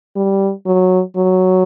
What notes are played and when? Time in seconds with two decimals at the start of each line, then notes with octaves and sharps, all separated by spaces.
0.16 G3
0.66 F#3
1.16 F#3